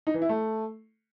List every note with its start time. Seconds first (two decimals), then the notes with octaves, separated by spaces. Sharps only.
0.07 D#4
0.14 E3
0.22 E4
0.29 A3